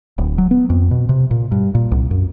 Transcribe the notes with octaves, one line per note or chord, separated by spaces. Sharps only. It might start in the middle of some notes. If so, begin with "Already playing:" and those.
D1
F#3
B3
F2
B2
C3
A#2
G2
A#2
C2
F#2